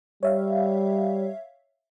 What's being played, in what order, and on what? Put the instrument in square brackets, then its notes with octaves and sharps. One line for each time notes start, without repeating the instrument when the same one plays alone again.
[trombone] G3 [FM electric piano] C#5 E5 F5